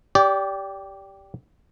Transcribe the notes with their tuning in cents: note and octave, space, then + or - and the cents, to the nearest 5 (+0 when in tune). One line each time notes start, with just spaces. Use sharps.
G4 +0 D5 -25